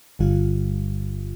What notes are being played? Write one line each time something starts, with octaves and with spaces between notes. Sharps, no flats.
G1 G2 D3 G3 F4